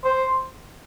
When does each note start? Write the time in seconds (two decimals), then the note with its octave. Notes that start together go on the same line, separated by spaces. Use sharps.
0.04 C5